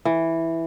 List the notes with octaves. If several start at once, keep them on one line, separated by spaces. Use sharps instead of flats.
E3